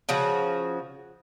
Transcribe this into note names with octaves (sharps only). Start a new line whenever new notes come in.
C#3 F3 F#4